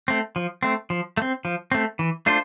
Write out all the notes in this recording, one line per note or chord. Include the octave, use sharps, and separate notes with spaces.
A3 C4
F3
A3 C4
F3
A3
C4
F3
A3 C4
E3
A3 D4 F4 C5